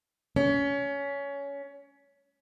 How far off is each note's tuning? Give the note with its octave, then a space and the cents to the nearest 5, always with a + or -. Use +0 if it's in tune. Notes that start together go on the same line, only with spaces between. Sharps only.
C#4 +20